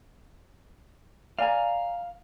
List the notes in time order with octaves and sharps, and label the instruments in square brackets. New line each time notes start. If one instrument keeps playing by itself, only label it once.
[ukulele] D5 G#5 A#5 [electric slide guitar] F5